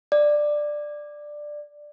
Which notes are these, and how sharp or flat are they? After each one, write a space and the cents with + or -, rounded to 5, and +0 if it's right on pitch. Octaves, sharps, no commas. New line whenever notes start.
D5 +10